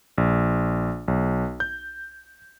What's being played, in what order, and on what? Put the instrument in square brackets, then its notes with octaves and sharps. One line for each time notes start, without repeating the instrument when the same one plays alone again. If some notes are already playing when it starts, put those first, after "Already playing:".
[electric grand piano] A#1
B1
G6